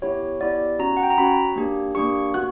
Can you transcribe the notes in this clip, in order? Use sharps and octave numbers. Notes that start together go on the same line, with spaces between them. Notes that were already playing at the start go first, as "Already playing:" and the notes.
B3 E4 G4 C#5
B3 E4 G4 D5
C#4 F#4 A#5
F#5
G5
A#5
C#4 F#4 B5
A#3 D4 G4
A#3 D4 G4 C#6
B3 F#4 F#6